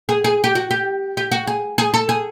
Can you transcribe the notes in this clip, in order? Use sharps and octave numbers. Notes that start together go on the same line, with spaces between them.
G#4
G#4
G4
F#4
G4
G4
F#4
G#4
G#4
A4
G#4